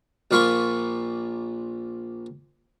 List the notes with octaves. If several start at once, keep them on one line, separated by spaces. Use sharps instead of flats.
A#1 A#2 F4 F5 B5 C#6